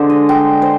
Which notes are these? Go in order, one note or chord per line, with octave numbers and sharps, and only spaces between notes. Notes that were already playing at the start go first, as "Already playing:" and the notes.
Already playing: D3 G#3 C5
D#5
G5
C5